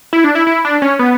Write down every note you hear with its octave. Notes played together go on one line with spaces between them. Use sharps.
E4
D4
E4
E4
D4
C#4
B3